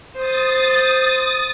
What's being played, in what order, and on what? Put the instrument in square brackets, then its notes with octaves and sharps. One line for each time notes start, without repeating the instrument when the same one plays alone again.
[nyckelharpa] C5 [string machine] D#6 A6